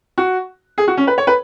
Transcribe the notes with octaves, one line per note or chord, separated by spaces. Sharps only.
F#4
G#4
F#4
C#4
B4
C#5
B4